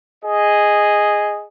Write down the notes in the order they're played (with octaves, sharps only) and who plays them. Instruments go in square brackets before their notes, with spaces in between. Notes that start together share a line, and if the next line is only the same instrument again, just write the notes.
[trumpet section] G#4 D#5